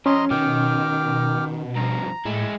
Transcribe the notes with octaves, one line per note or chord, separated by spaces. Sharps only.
F2 C#4 D#5 A#5 C6
B2 D#3 G5 D6 F6
G2 F3 A#5
A2 G#3 E4